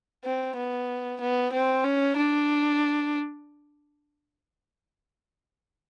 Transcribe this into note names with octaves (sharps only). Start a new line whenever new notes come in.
C4
B3
B3
C4
C#4
D4